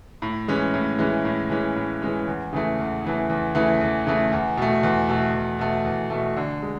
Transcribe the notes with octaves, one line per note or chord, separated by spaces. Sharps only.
A2
E3 G#3 C#4
A2
E3 G#3 C#4
A2
E3 G#3 C#4
A2
E3 G#3 C#4
E2
C#3 E3 A3
E2
C#3 E3 A3
E2
C#3 E3 A3
E2
C#3 E3 A3
E2
B2 A3
E2
B2 A3
E2
B2 A3
E2
B2 A3
D3
G#3